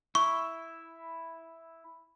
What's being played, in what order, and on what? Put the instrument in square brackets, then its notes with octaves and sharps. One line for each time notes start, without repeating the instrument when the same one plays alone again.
[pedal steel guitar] E4 [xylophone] C#6